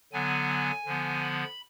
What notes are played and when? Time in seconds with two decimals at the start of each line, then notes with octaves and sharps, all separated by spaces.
0.13 D3 F#3 B3 G#5
0.86 D3 F3 B3
1.22 B5